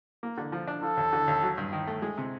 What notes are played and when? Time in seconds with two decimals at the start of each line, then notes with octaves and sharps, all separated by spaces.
0.23 A#3
0.37 D3
0.52 F3
0.67 D4
0.82 F3 A4
0.97 D#2
1.13 D3
1.28 D#2
1.42 F#3
1.58 G2
1.73 D#3
1.87 A3
2.02 G#3
2.18 C3